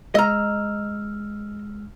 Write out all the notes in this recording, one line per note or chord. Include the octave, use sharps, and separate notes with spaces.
G#3 D#5 A#5 E6 F6